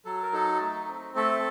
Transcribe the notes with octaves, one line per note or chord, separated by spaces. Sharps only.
F#3 A4
A#4
D#4 A4
A3
C4
A3 A4